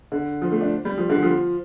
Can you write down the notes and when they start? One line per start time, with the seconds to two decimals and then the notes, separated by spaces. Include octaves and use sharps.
0.12 D3
0.42 F3
0.52 A3
0.61 D4
0.85 G3
0.98 F3
1.10 D3
1.23 F3